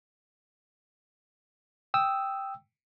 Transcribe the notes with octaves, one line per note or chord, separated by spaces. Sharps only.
G5 D#6 E6